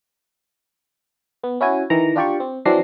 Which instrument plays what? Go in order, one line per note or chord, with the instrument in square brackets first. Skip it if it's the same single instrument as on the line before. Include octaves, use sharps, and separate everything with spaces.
[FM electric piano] B3
C#4 E4 F#4 G#5
D#3 E3 A#5
D4 F4 G4 D5 C#6
C4
E3 F#3 C4 D4 A#6 C7